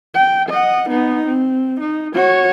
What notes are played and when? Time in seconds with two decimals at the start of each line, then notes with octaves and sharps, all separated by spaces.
0.15 G5
0.49 D#5 F#5
0.90 B3 D#4
1.26 C4
1.80 D#4
2.14 F#4 C#5